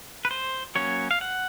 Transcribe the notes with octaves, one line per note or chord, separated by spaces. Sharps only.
B4
C5
F#3 A#3 C#4 C#5
F5
F#5